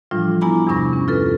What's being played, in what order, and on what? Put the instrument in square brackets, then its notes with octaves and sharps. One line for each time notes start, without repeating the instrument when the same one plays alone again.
[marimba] A2 E3 F3 G3 D4 F4
B3 E4 G#5 A#5 B5 D6
E2 G2 C3 D4 C#6 A#6
C#4
F4 A4 B4